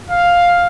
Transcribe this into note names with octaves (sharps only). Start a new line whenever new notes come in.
F5